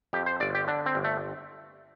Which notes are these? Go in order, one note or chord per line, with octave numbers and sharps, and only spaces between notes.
F2 G4
C5
G1 D5
G4
D3 D4
C4
G1
A3